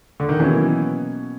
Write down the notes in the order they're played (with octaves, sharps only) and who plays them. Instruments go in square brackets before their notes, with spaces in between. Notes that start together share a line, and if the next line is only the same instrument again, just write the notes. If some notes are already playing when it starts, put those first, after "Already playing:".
[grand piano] D3
D#3
[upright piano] B2 F#3 A#3 C#4 [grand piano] E3